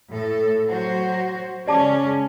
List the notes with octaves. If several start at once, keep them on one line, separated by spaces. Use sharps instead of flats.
A2 A4
F#3 F#4 C5
C#3 G#3 C#4 D5 A5 D6